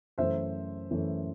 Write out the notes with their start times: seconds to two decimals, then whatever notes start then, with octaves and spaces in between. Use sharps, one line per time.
0.18 F#2 E3 A3 C5 E5
0.90 F#2 E3 A3